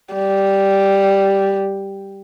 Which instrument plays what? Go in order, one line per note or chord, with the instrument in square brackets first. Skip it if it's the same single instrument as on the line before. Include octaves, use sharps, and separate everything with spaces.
[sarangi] G3